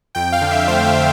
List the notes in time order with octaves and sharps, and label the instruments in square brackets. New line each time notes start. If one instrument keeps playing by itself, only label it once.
[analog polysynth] F2 G5
F5
D3
E5
A3 C5
E5